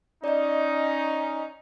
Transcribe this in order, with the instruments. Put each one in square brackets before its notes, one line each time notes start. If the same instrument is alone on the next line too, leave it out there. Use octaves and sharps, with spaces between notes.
[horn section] C#4 D#4 [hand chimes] D5 D#5